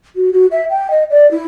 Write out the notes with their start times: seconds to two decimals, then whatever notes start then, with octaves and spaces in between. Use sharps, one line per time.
0.16 F#4
0.33 F#4
0.52 E5
0.70 G5
0.91 D#5
1.10 D5
1.31 E4